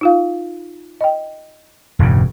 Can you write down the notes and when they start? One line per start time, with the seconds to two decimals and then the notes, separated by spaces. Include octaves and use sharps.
0.01 D#4 F4 F5
1.01 D#5 G5
1.99 E1 G2 C#3